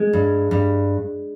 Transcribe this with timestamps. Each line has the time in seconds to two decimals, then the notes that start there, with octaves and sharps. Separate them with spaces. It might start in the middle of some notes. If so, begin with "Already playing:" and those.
Already playing: G#3
0.13 G2
0.51 G2